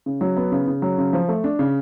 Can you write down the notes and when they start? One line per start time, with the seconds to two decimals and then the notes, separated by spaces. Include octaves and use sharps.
0.06 C#3
0.21 F#3
0.37 B3
0.52 C#3
0.67 C#3
0.82 F#3
0.98 C#3
1.13 F3
1.29 A3
1.44 D4
1.59 C#3